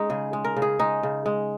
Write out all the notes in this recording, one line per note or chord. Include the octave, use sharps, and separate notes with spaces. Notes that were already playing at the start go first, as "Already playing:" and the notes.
Already playing: G#3 C#4 D#4
C#3 G#4
G#3
A#4
C#3
G#4
G#3 D#4
C#3
G#3